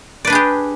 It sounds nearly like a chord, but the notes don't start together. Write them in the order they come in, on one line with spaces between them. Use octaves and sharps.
D5 B4 D4 G#4 G4